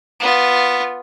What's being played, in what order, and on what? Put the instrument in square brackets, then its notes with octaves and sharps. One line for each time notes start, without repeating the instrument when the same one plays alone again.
[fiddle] B3 F4